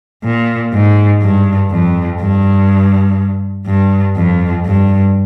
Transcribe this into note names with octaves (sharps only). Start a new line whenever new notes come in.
A#2
G#2
G2
F2
G2
G2
F2
G2